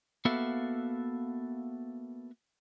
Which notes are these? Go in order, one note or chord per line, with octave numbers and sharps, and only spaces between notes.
A#3 B3 F#4 A4 E5 F5